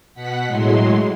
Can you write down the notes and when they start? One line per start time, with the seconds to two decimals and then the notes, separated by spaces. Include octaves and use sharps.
0.14 B2 F#5 B6
0.48 A2 F#3 G#3 C6